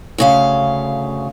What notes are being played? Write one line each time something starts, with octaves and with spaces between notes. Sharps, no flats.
D2 C#3 F5